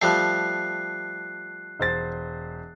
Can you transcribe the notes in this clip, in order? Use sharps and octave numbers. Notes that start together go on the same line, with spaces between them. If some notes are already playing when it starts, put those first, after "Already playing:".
F3 G3 A3 F#6 C7
E1 C5 A6